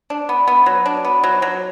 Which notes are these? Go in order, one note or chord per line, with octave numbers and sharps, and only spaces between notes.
D4
B3
B3
F#3
D4
B3
F#3
F#3